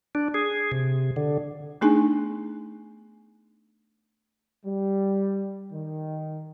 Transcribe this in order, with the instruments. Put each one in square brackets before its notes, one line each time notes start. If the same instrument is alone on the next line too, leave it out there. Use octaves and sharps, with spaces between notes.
[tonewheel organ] D4
G#4
C3
D3
[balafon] A3 B3 D4 D#4 G#4 G#5
[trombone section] G3
D#3